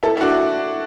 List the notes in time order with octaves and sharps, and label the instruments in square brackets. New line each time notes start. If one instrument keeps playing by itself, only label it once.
[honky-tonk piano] E4 A4
E4
D4 F#4